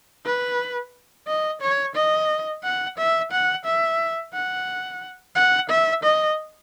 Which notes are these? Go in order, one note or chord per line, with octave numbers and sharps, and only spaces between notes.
B4
D#5
C#5
D#5
F#5
E5
F#5
E5
F#5
F#5
E5
D#5